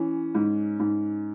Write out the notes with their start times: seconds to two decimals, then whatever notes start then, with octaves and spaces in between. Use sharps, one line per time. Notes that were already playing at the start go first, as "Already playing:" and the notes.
Already playing: E3 C#4
0.35 G#2
0.80 G#2